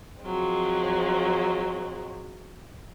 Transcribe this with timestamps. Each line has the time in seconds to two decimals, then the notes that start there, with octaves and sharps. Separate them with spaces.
0.22 F3 F#3 G#3 C4